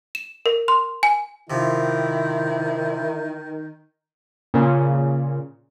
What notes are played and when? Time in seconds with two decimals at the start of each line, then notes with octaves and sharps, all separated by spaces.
0.15 E7
0.46 A#4
0.68 C6
1.03 G#5
1.50 C3 D#3 F3 E4
4.54 A#2 C#3